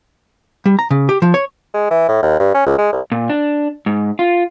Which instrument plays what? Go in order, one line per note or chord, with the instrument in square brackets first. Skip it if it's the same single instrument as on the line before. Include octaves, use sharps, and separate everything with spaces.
[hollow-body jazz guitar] G3
A#5
C#3
G4
F3
C#5
[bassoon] G#3
E3
A2
D#2
G2
C#4
C#2
G#3
C2
[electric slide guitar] A#2
D4
G#2
F4